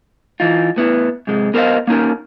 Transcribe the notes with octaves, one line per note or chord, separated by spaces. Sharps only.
E3 D#4 F4
A2 B3 E4
G#2 C3 G#3
B3 A#4 C5 C#5 D#5 F5
A#3 C#4 D#4 A#4